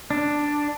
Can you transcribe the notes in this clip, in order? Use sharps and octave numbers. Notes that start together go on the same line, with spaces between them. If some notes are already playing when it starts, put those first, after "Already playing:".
D4